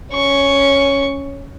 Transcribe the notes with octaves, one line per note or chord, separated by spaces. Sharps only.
C#4 C#6